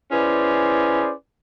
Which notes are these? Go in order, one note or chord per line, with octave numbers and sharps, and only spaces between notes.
C#4 E4 G#4 B4 C5 D5